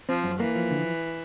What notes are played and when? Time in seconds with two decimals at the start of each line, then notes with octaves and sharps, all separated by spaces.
0.09 F3 C4
0.24 F#2
0.40 E3 A#3
0.55 F3
0.71 D3